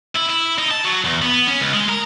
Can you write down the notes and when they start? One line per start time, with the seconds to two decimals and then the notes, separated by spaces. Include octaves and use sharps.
0.16 E4
0.30 E4
0.58 D#4
0.71 A5
0.84 F#3
1.04 E2
1.22 B3
1.47 C#4
1.60 C#2
1.74 G#3
1.89 A#4